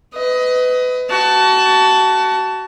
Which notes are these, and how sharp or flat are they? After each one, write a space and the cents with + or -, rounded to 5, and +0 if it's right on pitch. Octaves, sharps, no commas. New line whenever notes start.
B4 +25 D#5 +20
F#4 +30 A5 +0